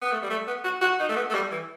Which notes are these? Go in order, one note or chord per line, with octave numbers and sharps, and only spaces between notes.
B3
A3
G3
A3
B3
F#4
F#4
D#4
A3
B3
A3
G3
E3